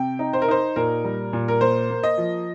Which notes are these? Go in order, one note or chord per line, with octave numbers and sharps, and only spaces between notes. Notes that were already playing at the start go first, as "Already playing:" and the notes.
Already playing: C3 G5
D#4
C5
A#4
D#4 C5
A#2 A#4
G3
A#2
A#4
A#3 C5
A#3
D#5
F3